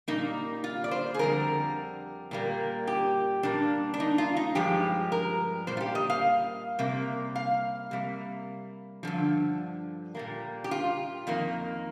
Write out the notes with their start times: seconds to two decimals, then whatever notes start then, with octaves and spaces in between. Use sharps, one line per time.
0.08 A#2 G3 A#3 D#4
0.64 F4
0.84 D5
0.91 C5
1.14 G#4
1.19 F2 D3 G3 A#4
2.31 A#2 G3 A#3
2.87 G4
3.43 A#2 G3 A#3 D4
3.94 D4
4.00 D#4
4.18 F4
4.37 D#4
4.55 G2 F3 G#3 G4
5.12 A#4
5.67 A#2 G3 A#3 C5
5.77 F4
5.81 G4
5.95 D#5
6.10 F5
6.79 C3 G3 A#3
7.36 F5
7.91 C3 G3 A#3
9.03 G2 D3 F3
10.15 A#2 G3 A#3
10.64 G4
10.71 F4
11.27 F2 D#3 A#3